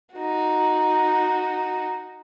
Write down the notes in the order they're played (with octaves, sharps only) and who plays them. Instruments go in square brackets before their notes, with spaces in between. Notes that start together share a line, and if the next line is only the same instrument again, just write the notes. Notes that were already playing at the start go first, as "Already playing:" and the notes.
[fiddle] D#4 F#4